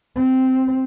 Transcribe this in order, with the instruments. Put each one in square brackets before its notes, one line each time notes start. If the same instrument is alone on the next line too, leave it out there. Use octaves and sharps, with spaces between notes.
[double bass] C4